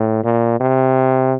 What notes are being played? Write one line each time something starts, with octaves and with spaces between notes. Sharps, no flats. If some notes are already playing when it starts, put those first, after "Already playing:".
Already playing: A2
A#2
C3